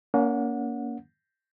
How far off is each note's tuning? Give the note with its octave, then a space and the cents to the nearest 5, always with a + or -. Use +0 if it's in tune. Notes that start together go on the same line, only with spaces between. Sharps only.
A#3 +10 C#4 +35 F#5 -25